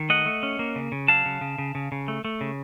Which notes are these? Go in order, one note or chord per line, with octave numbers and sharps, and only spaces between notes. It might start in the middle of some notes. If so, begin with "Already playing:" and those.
Already playing: D#3
A3 D#5 F#5
A3
C#4
A#3
C#3
C#3
F#3 F5 A5
C#3
C#3
C#3
C#3
C#3
A3
A3
C#3